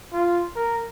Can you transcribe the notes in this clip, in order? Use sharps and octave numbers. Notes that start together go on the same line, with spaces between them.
F4
A#4